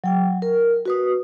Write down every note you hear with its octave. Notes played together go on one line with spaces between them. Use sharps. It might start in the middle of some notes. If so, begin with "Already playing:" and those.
F#3 G5
A#4
F#4 B4 D#6